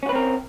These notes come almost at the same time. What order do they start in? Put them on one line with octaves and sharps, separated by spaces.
C#4 F#4 B4 C4 A#4